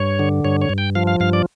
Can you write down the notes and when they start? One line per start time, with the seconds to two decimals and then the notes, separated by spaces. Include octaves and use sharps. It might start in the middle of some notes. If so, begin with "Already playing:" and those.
Already playing: G2 C#5
0.19 D3
0.44 G2 C#5
0.62 C#5
0.69 G2
0.78 G5
0.95 F3 F5
1.07 F5
1.20 G2 F5
1.33 D5